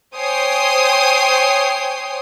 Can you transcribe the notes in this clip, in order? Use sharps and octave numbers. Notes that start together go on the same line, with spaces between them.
C5 C#5 G5 G#5 D#6 C7